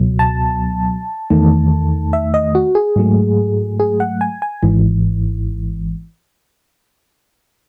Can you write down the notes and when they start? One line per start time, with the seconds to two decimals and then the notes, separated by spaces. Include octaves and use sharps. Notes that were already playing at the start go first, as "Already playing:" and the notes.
Already playing: C#2 B2 F#3
0.19 A5
1.30 E2 D#3 A3
2.13 E5
2.34 D#5
2.55 F#4
2.75 G#4
2.96 G#2 F#3 A3
3.80 G#4
4.00 F#5
4.21 G#5
4.42 G#5
4.63 G#1 G#2 E3